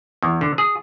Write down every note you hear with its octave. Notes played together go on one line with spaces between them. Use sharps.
E2
D3
G#4